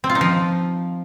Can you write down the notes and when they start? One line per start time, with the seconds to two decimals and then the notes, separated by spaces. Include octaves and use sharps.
0.04 C4
0.10 F4
0.15 D#4
0.21 F3